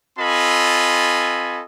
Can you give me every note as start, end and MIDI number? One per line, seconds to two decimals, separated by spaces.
0.19 1.63 60
0.19 1.63 65
0.19 1.63 69
0.19 1.63 75
0.19 1.63 80
0.19 1.63 83